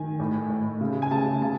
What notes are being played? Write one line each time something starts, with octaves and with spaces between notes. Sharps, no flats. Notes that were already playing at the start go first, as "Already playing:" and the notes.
Already playing: D#3 G#5
A2
A2
C#3
G#5
C#3 A5
C#3 A5